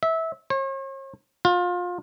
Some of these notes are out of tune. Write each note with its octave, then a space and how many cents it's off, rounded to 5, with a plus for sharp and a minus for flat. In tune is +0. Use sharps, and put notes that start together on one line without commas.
E5 -20
C#5 -45
F4 +30